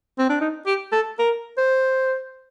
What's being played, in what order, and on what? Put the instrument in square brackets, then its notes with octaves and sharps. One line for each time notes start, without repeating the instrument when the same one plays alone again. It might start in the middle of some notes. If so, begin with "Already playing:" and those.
[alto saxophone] C4
D4
D#4
G4
A4
A#4
C5